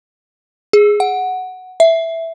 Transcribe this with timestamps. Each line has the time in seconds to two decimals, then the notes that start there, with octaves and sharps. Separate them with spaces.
0.73 G#4
1.00 F#5
1.80 E5